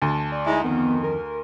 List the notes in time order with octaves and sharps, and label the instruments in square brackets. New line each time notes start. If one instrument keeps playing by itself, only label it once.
[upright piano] D2 [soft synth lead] A5
[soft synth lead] D5
[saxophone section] G#3 D#4 E4
[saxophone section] F2 D#3 [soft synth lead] B3
[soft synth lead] A#4